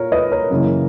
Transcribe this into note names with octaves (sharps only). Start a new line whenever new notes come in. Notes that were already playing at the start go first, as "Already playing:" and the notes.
Already playing: A#2 A#4 C#5
B4 D#5
A#4 C#5
F#2 C#3 E3 A#3